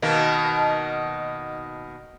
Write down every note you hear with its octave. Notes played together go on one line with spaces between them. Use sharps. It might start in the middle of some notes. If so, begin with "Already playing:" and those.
B2 D#3 A#3